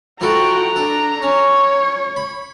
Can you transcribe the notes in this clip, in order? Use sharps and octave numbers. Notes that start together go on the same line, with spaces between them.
F3 E4 F#4 A4 G5 A#5
D4 A4
C#4 C#5
B5